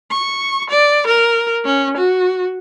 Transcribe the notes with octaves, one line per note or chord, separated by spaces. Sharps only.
C#6
D5
A#4
C#4
F#4